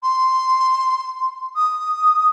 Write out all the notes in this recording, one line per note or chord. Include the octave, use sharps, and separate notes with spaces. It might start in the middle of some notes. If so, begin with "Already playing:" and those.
C6
D#6